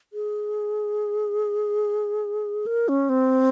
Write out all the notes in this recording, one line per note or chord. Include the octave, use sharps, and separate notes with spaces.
G#4
A#4
C#4
C4